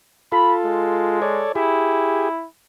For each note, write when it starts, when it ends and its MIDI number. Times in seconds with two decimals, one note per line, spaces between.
0.32 1.20 65
0.32 1.20 69
0.32 0.53 83
0.64 1.46 56
1.22 1.52 69
1.22 1.52 73
1.22 1.52 74
1.55 2.47 64
1.55 2.29 67
1.55 2.29 68